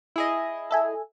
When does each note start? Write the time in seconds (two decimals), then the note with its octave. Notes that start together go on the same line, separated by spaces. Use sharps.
0.16 E4 G#4 D#5
0.71 A4 E5 G#5